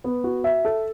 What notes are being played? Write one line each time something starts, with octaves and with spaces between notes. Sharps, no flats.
B3
F#4
E5
A4